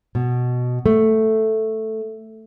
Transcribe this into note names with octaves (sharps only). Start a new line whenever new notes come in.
B2
A3